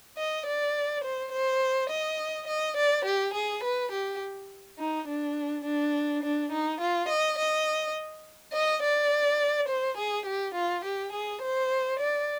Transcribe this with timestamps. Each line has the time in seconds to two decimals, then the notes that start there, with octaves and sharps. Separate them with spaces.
0.17 D#5
0.46 D5
1.04 C5
1.32 C5
1.90 D#5
2.48 D#5
2.77 D5
3.05 G4
3.34 G#4
3.64 B4
3.92 G4
4.79 D#4
5.08 D4
5.65 D4
6.23 D4
6.52 D#4
6.81 F4
7.09 D#5
7.39 D#5
8.53 D#5
8.83 D5
9.69 C5
9.98 G#4
10.26 G4
10.55 F4
10.84 G4
11.12 G#4
11.42 C5
12.00 D5